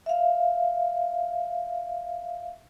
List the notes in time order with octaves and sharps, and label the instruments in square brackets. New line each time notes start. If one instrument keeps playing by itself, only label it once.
[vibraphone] E5 F5